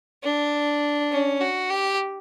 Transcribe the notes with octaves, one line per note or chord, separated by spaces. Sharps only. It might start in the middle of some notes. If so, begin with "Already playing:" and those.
D4
C#4
F#4
G4